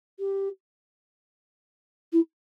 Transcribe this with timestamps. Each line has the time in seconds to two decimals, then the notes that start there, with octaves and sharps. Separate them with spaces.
0.19 G4
2.12 E4